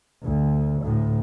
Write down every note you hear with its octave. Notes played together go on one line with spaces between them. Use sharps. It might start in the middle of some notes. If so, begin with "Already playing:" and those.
D2
D2 A2